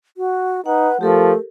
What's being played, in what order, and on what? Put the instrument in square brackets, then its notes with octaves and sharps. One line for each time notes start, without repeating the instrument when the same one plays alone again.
[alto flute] F#4
[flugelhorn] D#4 [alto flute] B4 [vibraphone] F#5
[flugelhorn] F3 [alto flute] A3 [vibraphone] G4 A4 A#4